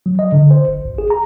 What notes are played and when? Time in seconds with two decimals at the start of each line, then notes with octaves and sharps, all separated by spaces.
0.06 F#3
0.19 D#5
0.32 D3
0.51 C5
0.68 G1
0.85 G#1
0.98 G#4
1.10 A#5